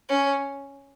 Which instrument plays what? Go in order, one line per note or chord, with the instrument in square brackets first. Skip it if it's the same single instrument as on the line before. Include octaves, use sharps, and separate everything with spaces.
[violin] C#4